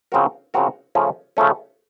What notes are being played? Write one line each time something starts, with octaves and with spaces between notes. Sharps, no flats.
C#3 F3 C4 F#4 A#4
C#3 F3 C4 F#4 A#4
C#3 F3 A3 C#4
C#3 F3 A3 C#4